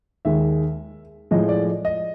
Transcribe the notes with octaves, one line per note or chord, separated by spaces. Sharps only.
D#2 D#3 G#3 E5
A2 F3 G#3 D#5
D5
D#5